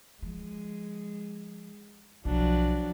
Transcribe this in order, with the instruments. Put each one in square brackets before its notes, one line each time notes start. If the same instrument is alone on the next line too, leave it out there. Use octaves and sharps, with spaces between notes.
[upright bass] F3 [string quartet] G#3
[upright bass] B1 [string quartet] F3 F#3 D4